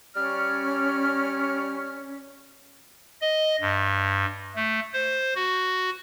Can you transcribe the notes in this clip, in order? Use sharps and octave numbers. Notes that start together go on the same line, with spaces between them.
G3 C#4 D5 F6
D#5
G2
A3
C5
F#4